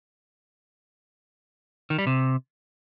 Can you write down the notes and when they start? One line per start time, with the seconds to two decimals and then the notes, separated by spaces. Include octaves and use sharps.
1.90 D#3
1.98 G3
2.07 C3